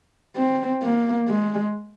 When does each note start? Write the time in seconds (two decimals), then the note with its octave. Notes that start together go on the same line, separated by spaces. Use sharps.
0.37 C4
0.83 A#3
1.28 G#3